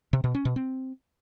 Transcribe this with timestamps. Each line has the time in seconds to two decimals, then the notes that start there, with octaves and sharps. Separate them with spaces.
0.13 C3
0.24 B2
0.35 C#4
0.45 B2
0.56 C4